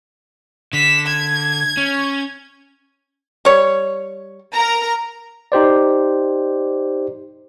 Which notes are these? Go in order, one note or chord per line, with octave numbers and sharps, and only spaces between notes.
D3 B6 E7
G#6
C#4
G3 C#5
A#4 A#5
D#4 G4 C5 D5